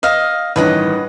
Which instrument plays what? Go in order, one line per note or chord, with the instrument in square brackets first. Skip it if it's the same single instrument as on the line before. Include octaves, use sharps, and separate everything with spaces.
[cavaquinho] D#5 F5
[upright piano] A1 G2 D#3 [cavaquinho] B4 D#5 F#5